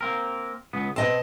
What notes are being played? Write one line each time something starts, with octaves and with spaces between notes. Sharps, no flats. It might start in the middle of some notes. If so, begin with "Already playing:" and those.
A#3 C4 A#4
C#2 B3
B2 C4 D#5 A5